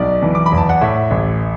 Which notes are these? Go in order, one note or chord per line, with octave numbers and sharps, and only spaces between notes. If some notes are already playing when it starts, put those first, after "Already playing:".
Already playing: B1 B2 D5
E3
D6
B5
E2
A5
F#5
A2 E5
A1